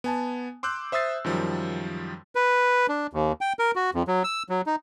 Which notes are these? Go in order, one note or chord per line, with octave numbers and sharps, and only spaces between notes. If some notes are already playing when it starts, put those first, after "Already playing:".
B3 G#5 A5
C6 D6 E6 F#6 G6
C5 E5 D#6 E6 A6 C7
F#2 D#3 F3 G3
B4
D4
D#2
G5
A#4
F#4
F2
F#3
E6
F#3
D#4